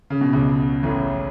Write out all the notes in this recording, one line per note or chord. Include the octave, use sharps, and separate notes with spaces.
C#3
B2
C#2 C#3
A1 A2